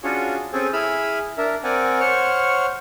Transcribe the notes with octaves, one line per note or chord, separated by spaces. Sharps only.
C#4 D4 F4 F#4 G#4 C#5
C4 C#4 G#4 A4
E4 G#4 B5 E6 F6
D4 A#4 E5
C4 A#4 D5 F#5 G#5
C5 C#5 F#5 C#6 F6